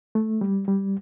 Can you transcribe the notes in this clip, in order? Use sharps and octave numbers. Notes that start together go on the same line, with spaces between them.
A3
G3
G3